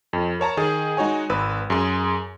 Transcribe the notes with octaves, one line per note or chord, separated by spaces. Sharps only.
F2
A#4 C#5 A5 A#5
D#3 G#4
G#3 D#4 F#4 C#5 G#5
G#1 B4 E6
F#2 G#4 C6